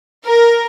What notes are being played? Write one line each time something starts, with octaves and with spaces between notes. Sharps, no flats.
A#4